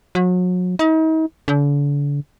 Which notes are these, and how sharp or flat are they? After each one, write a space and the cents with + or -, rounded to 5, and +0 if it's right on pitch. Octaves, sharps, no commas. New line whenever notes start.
F#3 -35
D#4 +40
D3 -40